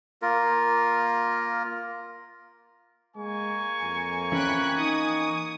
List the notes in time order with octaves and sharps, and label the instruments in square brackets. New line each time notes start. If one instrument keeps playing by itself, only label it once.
[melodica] A#3 F4 A#4
[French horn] G#3 [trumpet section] A#3 G#5 C#6
[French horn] F2
[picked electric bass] E3 C#4 [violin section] G5 B5 F#6
[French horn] D#4 [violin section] D#6